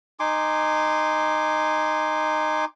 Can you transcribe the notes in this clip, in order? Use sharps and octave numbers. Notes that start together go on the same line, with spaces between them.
D#4 G#5 C6 D6